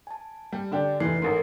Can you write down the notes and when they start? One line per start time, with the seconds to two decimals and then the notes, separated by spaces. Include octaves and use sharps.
0.07 G#5 A5
0.52 G3
0.71 D3 D4 G4
1.00 F1 E3 C7
1.22 A1 G#2 A4 A#4